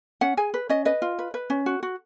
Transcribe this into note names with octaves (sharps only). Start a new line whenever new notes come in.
C#4 F#5
G#4 G#5
B4
C#4 D#5
B4 D#5
F4
B4
B4
C#4
F#4
F#4